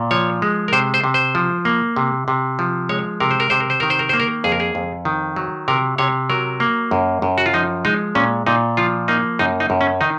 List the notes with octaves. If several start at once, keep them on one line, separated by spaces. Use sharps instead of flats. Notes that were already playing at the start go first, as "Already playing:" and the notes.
Already playing: A#2
F3 C#5
G#3
A#4
C3 C5
C5
C3
C5
F3
A#3
C3
C3
F3
G#3 C#5
C3 A#4
C5
A#4
C3 C5
A#4
C5
D#3 A#4
C5
A#4
A#3 C5
A#4
F2 G#4
A#4
G#4
F2
D#3
F#3
C3 A#4
C3 C#5
F#3 A#4
A#3
F#2
F#2
F#4
F4
F3 D#4
G#3 D#4
A#2 C#4
A#2 D#4
F3 F4
A#3 D#4
F#2 D#4
D#4
F#2
C#4
D#3 D#4